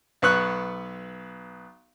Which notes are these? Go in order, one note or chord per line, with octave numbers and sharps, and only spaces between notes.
B1 B3 B4 C#6 F#6